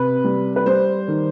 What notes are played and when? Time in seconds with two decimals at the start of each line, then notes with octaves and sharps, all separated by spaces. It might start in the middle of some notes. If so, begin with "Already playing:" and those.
Already playing: C3 B4
0.24 G3
0.56 B4
0.66 G3 C5
1.08 D#3